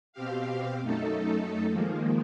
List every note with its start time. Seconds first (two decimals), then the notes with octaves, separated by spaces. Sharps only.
0.13 B2 C4 G4 F5
0.82 F#2 A3 D#4 A4
1.68 D#3 F3 G#3 A#3